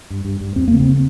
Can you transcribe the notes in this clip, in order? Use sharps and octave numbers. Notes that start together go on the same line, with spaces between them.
G2
G2
G2
E2 C4
C#3 A#3
C4